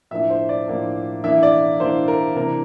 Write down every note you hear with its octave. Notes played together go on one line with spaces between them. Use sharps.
A2 F3 A#3 D4 E5
C5
D5
A2 F3 A#3 D4
E3 A#3 D4 E5
D5
E3 A#3 D4 C5
A#4
C3 E3 A#3 D4 A#4